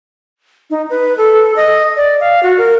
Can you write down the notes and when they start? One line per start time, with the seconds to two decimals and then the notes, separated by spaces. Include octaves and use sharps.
0.70 D#4
0.90 B4
1.18 A4
1.56 D#5
1.96 D5
2.20 F5
2.43 F#4
2.58 A#4